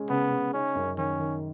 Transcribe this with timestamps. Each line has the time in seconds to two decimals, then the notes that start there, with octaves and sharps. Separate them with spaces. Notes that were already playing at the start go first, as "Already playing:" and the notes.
Already playing: G#3 C#4
0.10 C#3 B3
0.31 C#3
0.53 C#4 D#4
0.75 F#2
0.97 D#3 C#4
1.19 D#3